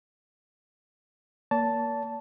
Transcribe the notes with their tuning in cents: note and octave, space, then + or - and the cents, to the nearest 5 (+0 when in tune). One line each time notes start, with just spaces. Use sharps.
A#3 +0 D5 -45 A5 +0